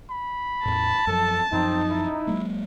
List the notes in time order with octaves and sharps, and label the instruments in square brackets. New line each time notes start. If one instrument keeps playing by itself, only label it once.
[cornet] B5
[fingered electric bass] E2 A2 [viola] A5
[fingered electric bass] F#2 F3 [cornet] A4
[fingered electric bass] F#2 F3 [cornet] C4 [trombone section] D#4
[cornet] E4
[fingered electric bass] F#3 G#3 A#3